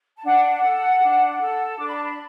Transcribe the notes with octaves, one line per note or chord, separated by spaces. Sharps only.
A5
D4 F#5
A4
D4
A4
D4 D6
B5
A5
B5